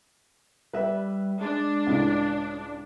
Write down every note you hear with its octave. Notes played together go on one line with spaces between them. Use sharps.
G3 B4 E5
G#3 D4
C#2 A2 C#3